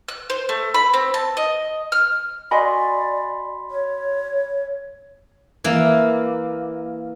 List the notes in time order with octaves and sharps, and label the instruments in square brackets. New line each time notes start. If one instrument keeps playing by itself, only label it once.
[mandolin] F#6
C5
A3
B5
C4
A5
D#5
F6
[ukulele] F#4 D#5 G#5 [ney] D5 [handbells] B5 C6
[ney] C#5
[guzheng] E3 A#3